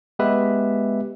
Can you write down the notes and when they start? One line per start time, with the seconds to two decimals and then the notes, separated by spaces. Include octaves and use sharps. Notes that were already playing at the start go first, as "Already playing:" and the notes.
0.19 G#3 B3 G4 B4 E5